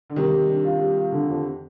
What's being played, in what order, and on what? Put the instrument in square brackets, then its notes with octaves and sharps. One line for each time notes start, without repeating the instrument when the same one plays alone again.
[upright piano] D3
[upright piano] C3 D#3 [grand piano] G3
[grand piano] G3
D4
F4
G3
F4
D3
F2